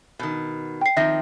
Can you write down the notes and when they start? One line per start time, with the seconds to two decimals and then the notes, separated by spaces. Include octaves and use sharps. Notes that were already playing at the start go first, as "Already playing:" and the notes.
0.19 B2 D#3
0.81 G5 C7
0.97 D#3 F3 C4 E5 A#6